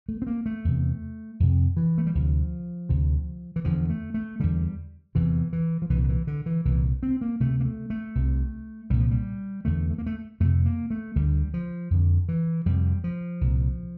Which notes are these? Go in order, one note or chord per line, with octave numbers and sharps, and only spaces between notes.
A3
C4
A#3
A3
E2 C3
F2 C3
E3
A3
G3
D2 C3 F3
D2 C3
E3
E2 D3 F3
A3
A3
E2 D3 G3
E2 C3 E3
E3
F3
C2 A#2 E3
D3
E3
D3
E3
C2 A#2 E3
C4
A#3
D2 C3 A3
A#3
A3
A3
C2 C3
C2 A#2 G3
F3
G3
E2 D3 A3
A3
A#3
A3
F2 C3 A3
A#3
A3
D2 D3 G3
F3
F2 D3
E3
F2 C3 G3
F3
C2 A#2